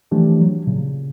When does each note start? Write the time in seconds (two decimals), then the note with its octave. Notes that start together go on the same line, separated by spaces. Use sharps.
0.11 E3 F3 A3 D4 G4
0.41 F#3
0.67 A#2 C#3